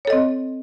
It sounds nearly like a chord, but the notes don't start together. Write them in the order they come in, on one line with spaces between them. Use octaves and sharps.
C#5 A4 D#5 C4